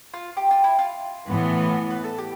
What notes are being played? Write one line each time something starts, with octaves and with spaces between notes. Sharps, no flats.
F4
G4
F4
E4
F4
A2 E3 B3
B4
A4
G4